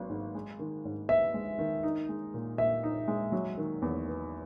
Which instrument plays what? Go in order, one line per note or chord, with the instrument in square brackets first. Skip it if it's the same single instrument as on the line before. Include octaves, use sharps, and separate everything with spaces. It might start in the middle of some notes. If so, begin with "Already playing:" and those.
Already playing: [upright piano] G#1 F#3 B3
G#2
G#3
D#3
G#2
[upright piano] B3 [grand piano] E5
[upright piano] G#3
D#3
D#4
G#3
A#2
[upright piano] A#2 [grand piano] E5
[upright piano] D#4
G#3
F#3
D#3
E2
B3